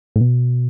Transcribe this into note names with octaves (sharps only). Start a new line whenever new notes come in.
A2
B2